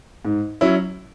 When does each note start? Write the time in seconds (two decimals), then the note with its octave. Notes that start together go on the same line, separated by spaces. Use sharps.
0.25 G#2
0.61 F#3 C#4 E4